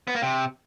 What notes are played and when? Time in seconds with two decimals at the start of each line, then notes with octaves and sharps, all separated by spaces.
0.07 B3
0.15 A#3
0.22 C3